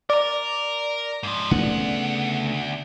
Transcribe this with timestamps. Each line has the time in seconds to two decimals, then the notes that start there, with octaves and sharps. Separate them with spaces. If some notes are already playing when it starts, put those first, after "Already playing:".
0.10 A#4 D5 A#5
1.23 G#2 F3
1.51 D2 C#3 A3 B3 F#5